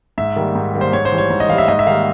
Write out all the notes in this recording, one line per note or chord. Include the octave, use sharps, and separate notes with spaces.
G#2 E5
D#3 G3 A#3
G#2
D#3 G3 A#3
C5
G#2 C#5
C5
E3 G3
C#5
G#2
D#5
E3 G3 F5
E5
G#2 D#5
E5
D#3 G3 A#3 F5